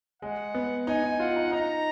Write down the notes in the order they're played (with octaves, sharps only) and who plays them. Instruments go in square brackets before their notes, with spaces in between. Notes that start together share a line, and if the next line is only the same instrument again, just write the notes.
[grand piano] G#3 [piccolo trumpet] F#5
[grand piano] B3
[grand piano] D#4 [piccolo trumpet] G#5
[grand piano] D#4
[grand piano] F4 [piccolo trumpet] F#5
[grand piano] D#4
[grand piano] D#4 [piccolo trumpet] A#5